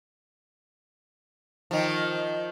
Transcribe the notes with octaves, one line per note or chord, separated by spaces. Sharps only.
D#3 F3